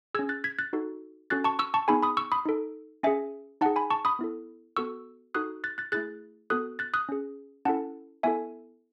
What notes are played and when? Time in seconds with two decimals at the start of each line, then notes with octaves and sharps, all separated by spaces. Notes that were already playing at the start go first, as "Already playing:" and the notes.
0.14 G#4 E6 G#6
0.19 C#4
0.29 F#6 A6
0.44 G#6 B6
0.59 F#6 A6
0.73 D#4 F#4 A4
1.30 C#4 F#4 A4 F#6 A6
1.44 A5 C#6
1.59 C#6 E6
1.74 A5 C#6
1.88 B3 D#4 G#4 G#5 B5
2.03 B5 D#6
2.17 C#6 E6
2.32 B5 D#6
2.45 D#4 A4
3.03 C#4 G#4 E5 G#5
3.61 D#4 F#5 A5
3.66 G#4
3.76 G#5 B5
3.90 A5 C#6
4.05 B5 D#6
4.19 B3 E4 A4
4.77 B3 F#4 A4 C#6 E6
5.34 D#4 F#4 A4 D#6 F#6
5.64 F#6 A6
5.78 F#6 A6
5.92 A3 E4 G#4 F#6 A6
6.50 B3 F#4 A4 D#6 F#6
6.79 F#6 A6
6.94 D#6 F#6
7.09 C#4 G#4
7.65 C#4 E4 A4 F#5 A5
8.23 B3 E4 A4 E5 G#5